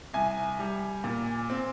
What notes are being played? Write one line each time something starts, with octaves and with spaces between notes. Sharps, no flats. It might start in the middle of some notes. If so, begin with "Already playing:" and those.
C2 G#5
G3
A#2
C4